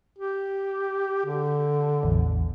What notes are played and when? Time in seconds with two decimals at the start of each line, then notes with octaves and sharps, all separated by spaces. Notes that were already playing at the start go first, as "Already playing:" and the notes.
0.18 G4
1.26 D3
2.03 A1 E2